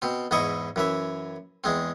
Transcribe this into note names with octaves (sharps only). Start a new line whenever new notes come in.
B2 C4
E2 G#2 E4 D#5 C#6
F#2 E3 E5
E2 G#3 C4